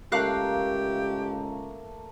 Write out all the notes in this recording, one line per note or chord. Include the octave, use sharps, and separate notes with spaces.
C#2 A3 A#3 G4 A#4 F5 D6 F#6